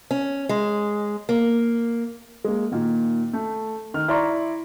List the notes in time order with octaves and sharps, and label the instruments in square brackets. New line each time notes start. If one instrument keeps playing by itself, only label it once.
[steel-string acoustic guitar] C#4
G#3
A#3
[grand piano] G#3 A#3
A#2 D#3
A3
D#3 F6
E4 D5 A#5 C6 C#6